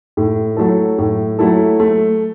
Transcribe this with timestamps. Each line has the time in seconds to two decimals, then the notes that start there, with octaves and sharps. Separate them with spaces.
0.17 A2
0.57 F#3 A3 E4 A4
0.98 A2
1.39 F#3 A3 E4 A4
1.80 A3